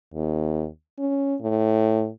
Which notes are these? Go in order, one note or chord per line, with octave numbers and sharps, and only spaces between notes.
D#2
C#4
A2